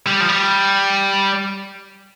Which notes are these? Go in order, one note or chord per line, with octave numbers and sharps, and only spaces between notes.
G3
F3
G3